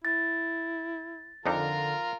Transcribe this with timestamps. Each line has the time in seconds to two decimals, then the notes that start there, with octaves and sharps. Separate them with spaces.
0.05 E4 A6
1.46 F2 D3 D4 D#4 F4 A#4